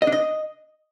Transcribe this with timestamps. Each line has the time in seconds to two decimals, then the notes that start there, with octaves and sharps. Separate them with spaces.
0.02 D#5
0.07 D4
0.12 D#5